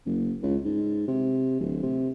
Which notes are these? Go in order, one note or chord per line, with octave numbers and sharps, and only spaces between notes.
F#1
C#2
G#2
C3
D1
C3